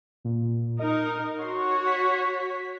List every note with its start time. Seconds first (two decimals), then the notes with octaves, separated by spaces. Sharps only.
0.25 A#2
0.80 D#4 A#4 D#5
1.41 F#4 C#5 C6
1.87 B6